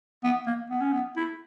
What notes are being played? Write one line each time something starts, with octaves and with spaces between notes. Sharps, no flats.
B3
A#3
B3
C#4
B3
E4